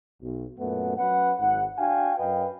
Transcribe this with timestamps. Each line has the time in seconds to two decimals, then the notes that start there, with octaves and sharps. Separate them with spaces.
0.22 B1
0.58 F#2 A#2 A3 B3 F#5
0.98 F#3 C#4 B4 F#5
1.38 G#1 G#2 F#5
1.77 D4 F#4 F5 G5 G#5
2.18 F#2 B4 D#5 F5 G5